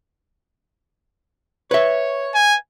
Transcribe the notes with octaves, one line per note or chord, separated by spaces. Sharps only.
B4 C#5 E5
G#5